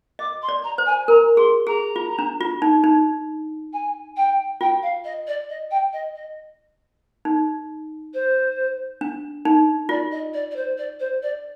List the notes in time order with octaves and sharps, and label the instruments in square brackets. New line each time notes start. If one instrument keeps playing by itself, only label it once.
[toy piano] D#5 [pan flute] D6
[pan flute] C6
[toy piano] D5
[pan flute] A#5
[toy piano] C5
[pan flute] G#5
[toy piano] A#4 [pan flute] A#5
[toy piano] G#4 [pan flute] C6
[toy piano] G#4 [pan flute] A#5
[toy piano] F4
D4
F4
D#4
D#4
[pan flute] G#5
G5
[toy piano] F4 [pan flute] G5
[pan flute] F5
D#5
D5
D#5
G5
D#5
D#5
[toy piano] D#4
[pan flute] C5
[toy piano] D4
D#4
[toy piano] F4 [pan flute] D5
[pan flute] D#5
D5
D5
C5
D5
C5
D5